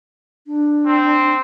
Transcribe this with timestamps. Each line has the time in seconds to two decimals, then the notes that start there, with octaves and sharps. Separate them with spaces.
0.47 D4
0.86 C4